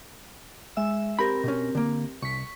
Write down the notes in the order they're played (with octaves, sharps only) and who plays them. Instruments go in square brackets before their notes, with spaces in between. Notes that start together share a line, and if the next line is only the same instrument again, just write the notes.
[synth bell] G#3 E5 E6
[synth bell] C4 G4 A#4 [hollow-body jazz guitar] B5
[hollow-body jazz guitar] B2 C#4
D3 A#3
[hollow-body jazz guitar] C2 [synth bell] C#6 B6